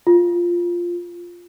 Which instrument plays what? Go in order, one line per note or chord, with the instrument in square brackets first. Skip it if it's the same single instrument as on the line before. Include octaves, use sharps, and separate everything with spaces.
[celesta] F4